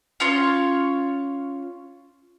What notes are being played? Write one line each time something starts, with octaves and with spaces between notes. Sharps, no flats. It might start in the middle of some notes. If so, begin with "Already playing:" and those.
C#4 F4 C#5